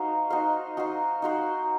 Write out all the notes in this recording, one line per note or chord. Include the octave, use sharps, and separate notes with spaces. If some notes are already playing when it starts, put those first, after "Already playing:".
Already playing: D#4 F#4 C5 F5
D#4 F#4 C5 F5
D#4 F#4 C5 F5
D#4 F#4 C5 F5